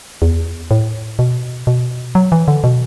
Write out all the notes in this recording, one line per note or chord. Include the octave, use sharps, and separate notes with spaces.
E2
A2
B2
B2
F#3
E3
D3
B2